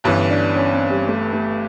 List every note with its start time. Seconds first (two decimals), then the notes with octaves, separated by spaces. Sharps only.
0.04 G1 G2 E3 C#4
0.30 D4
0.55 C#4
0.73 C4
0.90 G3
1.07 A3
1.33 A3